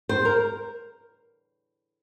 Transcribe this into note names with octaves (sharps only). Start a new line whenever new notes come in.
C5
A#4